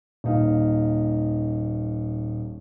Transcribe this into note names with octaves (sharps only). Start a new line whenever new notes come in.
D#1 D#4 F5